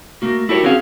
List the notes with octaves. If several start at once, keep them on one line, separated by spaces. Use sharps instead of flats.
A3 A#3 F#4
E4 F#4 G4 A4 A#4 C#5
C4 C#4 F#4 G#4 F5